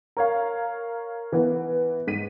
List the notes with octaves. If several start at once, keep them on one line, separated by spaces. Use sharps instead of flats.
A#4 C#5 F5
E3 B3
G#2 B6 D#7